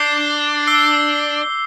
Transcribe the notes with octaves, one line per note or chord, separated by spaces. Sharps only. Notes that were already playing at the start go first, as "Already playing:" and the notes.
Already playing: D4 D6 G6 C7 G7
E6 C7 G7